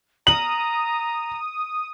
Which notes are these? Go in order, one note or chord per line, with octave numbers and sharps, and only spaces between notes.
A#5 D#6 F#7